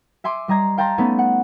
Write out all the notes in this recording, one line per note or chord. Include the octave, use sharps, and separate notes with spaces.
E5 G#5 C6 D6
G3 D#5 A#5 G#6 C7
F5 G5 A5 A#5 C6
A3 B3 C#4 D#4
F#5